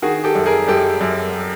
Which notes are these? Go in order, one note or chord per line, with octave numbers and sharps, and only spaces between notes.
D#3 F#4 G#4
G4 A4
F#2
G#4 A#4
F#2 G4 A4
F#2